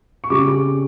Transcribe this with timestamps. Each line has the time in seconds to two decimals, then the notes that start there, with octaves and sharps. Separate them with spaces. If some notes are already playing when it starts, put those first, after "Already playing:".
0.24 C#6
0.30 C#3 G3 D6